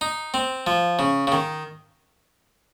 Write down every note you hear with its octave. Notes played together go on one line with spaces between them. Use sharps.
D#4
C4
F3
C#3
C#3
D#3